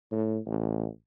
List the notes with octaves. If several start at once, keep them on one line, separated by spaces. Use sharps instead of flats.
A2
A1